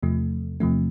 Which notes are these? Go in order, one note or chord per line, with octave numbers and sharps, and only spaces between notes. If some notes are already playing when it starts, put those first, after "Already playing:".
E2 C3 F3 A3
E2 C3 F3 A3